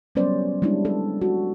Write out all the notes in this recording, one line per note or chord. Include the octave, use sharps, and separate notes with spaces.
F#3 G3 B3 C#4 C5 D5
G3 G#3 D4 E4
A4
F#4